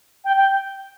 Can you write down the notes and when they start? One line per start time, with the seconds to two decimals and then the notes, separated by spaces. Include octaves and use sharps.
0.25 G5
0.37 G5